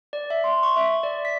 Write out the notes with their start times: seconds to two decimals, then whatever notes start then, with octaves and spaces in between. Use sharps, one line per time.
0.13 D5
0.30 E5
0.44 C6
0.63 C#6
0.76 E5
1.03 D5
1.25 B6